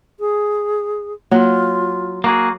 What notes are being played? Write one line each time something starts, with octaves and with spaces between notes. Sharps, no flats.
G#4
F#3 A#3 F4
A#3 F#4 G#4